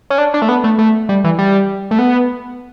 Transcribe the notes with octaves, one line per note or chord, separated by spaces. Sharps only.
C#4
D4
D4
A3
B3
A3
A3
G3
E3
G3
A3
B3